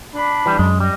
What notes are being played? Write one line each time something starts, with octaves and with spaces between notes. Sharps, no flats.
D4 B5
E3 G3
F#2 G#3
G3 D#5